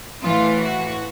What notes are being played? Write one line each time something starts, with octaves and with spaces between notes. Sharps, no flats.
A2 E3 F4
F#4